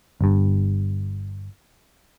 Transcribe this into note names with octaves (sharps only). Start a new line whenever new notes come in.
G1 G2